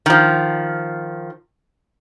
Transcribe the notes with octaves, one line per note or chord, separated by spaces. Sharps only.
D#3 F3